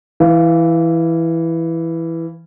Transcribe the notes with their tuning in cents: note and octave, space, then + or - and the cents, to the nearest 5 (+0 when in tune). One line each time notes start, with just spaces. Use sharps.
E3 +0 F5 -20